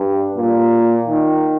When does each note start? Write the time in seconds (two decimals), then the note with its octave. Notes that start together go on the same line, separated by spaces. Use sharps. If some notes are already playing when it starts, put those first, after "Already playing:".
Already playing: G2
0.37 A#2
1.08 D#3